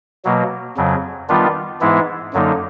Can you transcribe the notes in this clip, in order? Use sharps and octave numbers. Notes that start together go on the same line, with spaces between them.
B2 F#3 A#3
F2 C#3 F#3
D#3 G3 B3 D4 F4
G#2 E3 G#3 B3 E4
F#2 D3 F#3 A#3 D#4